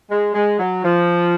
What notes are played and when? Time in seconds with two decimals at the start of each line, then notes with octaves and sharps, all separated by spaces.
0.10 G#3
0.34 G#3
0.59 F#3
0.84 F3